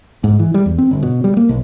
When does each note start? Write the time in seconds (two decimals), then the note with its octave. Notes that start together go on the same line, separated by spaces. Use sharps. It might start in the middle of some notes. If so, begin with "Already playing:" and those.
0.24 G#2
0.39 E3
0.54 G3
0.66 E2
0.78 C4
0.91 G1
1.03 B2
1.24 G3
1.37 A#3
1.49 B1